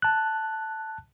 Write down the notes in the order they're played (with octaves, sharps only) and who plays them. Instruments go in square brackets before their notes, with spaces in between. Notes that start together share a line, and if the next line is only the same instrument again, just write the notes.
[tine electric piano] A5 F#6